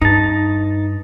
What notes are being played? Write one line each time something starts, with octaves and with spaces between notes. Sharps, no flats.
G2 D#4 A5